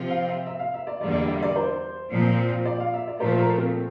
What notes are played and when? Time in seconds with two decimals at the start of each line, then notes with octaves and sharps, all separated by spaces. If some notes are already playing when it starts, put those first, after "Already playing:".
Already playing: C3 F3 C4 F4
0.10 F5
0.28 E5
0.47 E5
0.59 F5
0.74 E5
0.87 D5
1.01 E2 D3 G3 A#3 D5
1.15 D5
1.28 E5
1.42 D5
1.56 C5
2.11 A#2 F3 C4
2.65 D5
2.80 F5
2.93 E5
3.07 D5
3.20 A#2 F3 A3 C5
3.39 A#4
3.57 C4